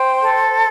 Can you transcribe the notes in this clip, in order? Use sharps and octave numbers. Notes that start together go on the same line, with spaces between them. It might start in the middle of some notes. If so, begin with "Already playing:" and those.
Already playing: C5 G5
A4